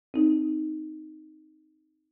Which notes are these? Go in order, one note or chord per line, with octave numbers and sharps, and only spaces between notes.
C4 D#4